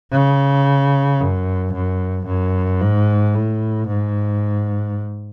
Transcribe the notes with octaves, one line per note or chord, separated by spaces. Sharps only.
C#3
F#2
F#2
F#2
G#2
A2
G#2